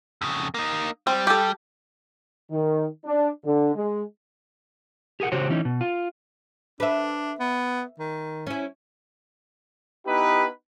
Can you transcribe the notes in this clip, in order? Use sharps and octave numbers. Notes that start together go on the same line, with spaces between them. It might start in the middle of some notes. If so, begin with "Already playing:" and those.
F2 C#3
A#3 D#4
G3 C4
G4 A4
D#3
D4
D3
G#3
G4 G#4 A#4 F#5
C#3 F#4 G4 C5 C#5
E3 C#4 D#4
B2
F4
D4 B4 E5
B3
D#3
C#4 E4
B3 D#4 E4 G4 B4